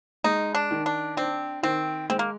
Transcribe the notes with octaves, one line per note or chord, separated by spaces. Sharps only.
G#3 D#4
D4
D#3
D4
C4 D4
D#3 C4
G#3 C4
A#3